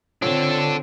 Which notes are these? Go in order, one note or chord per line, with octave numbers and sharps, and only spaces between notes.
D3 C4 D4 F4 A4 C#5 A5